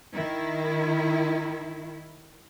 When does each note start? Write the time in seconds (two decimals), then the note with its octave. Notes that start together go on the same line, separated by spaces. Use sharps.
0.13 D#3 E4